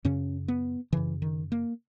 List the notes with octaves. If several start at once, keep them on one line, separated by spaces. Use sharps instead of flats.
F#2 C#3 C#4
B3
F#2 C#3 E3
D#3
A#3